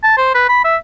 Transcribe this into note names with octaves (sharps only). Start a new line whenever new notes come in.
A5
C5
B4
B5
E5